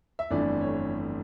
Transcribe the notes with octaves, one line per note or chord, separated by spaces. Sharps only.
E5
G1 F2 E3 A3 D4 D5
C#5